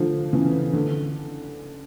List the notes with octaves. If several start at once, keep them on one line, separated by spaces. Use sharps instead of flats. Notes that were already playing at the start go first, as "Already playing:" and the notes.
Already playing: D3 F3
C#3 E3
D3